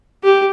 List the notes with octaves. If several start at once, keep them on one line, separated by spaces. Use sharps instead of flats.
G4